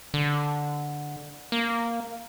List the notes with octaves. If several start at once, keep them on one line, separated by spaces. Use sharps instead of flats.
D3
A#3